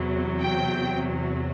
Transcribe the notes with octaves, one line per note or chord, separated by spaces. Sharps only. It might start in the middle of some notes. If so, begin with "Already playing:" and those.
Already playing: E2 C3 F#3
G5